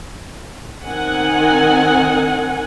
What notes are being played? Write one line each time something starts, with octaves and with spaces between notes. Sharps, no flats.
D#3 C4 D#4 F#5 G#5